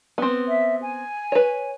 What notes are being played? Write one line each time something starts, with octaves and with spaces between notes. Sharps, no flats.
B3 C4
E5
G#5
B4 C#5